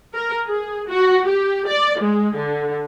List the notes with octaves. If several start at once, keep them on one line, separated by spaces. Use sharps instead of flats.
A#4
G#4
F#4
G4
D5
G#3
D3